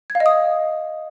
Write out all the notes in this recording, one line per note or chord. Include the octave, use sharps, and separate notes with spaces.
G#6
F5
D#5
D#6
D#5